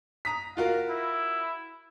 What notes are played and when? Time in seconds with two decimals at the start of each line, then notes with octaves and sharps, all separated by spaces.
0.25 A#5 D#6 B6
0.57 F4 F#4 A#4 F5
0.89 E4